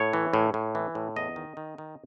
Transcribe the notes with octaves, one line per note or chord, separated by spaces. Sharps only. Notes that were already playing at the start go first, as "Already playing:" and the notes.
Already playing: A2 C#5
E3
A2
A2
E3
A2
E2 D#5
D#3
D#3
D#3